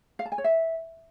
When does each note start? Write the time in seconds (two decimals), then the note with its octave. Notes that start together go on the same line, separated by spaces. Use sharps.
0.19 F5
0.25 A5
0.32 G#5
0.38 C#5
0.44 E5